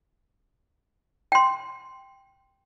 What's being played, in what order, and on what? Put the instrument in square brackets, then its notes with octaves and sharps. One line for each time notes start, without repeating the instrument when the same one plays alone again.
[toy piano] G5 C6